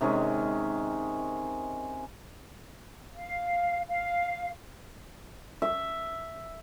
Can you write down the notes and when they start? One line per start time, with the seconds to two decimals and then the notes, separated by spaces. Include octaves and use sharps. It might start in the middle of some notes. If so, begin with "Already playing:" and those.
0.01 C3 D#3 G#3 C#4
3.14 F5
3.88 F5
5.62 E5